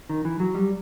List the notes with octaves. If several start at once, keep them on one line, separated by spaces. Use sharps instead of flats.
D#3
E3
F#3
G3